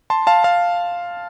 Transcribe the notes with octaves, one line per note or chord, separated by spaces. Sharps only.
A5 C6
F5 A5
F5 A5